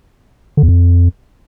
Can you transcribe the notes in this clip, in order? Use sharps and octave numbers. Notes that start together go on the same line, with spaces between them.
D3
E2
F2